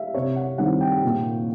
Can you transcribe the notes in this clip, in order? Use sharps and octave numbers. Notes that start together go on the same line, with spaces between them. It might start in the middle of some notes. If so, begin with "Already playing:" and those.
Already playing: E5 F5
C3 C#5
F#5
D#3 G3 C4 E4 F#5
G5
A#2